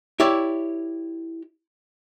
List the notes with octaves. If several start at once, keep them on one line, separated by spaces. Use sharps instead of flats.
E4 G4 C#5 D5